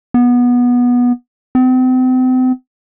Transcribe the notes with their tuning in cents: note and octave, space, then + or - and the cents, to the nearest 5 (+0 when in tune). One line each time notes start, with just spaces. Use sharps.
B3 -15
C4 -40